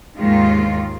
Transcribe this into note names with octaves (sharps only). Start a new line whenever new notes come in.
D#2 G#2 D#3 G#3 F4